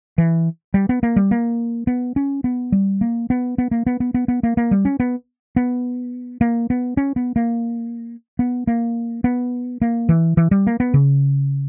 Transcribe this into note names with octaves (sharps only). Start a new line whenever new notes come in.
E3
G3
B3
A#3
G3
A#3
B3
C#4
B3
G3
A#3
B3
B3
A#3
B3
B3
B3
B3
A#3
A#3
G3
C#4
B3
B3
A#3
B3
C#4
B3
A#3
B3
A#3
B3
A#3
E3
E3
G3
A#3
B3
C#3